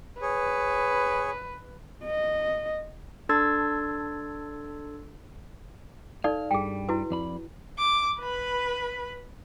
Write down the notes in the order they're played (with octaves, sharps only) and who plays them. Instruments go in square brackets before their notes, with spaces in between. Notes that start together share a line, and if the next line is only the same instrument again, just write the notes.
[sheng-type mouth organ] G#4 C#5 [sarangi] B4
[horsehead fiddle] D#5
[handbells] D4 A4 C6 E6 G#6 A6
[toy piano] D#4 A4 D5 [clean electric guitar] F5
[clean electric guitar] G2 G3 [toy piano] G#4 G5
[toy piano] E4 F#4 B4
[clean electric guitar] F2 D5 B5
[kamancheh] D6
B4 B5